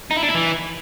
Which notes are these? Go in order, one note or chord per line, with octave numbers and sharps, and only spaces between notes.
D#4
E4
D4
E4
E3